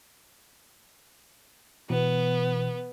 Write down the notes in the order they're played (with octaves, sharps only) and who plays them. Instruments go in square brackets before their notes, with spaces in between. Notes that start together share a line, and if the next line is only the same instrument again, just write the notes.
[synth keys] B2 E3 [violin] B3